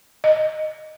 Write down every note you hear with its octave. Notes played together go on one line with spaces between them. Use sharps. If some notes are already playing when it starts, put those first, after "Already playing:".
D#5